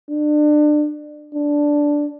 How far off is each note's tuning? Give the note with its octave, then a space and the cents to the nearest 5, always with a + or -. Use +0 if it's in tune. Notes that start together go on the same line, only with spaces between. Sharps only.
D4 +30
D4 -5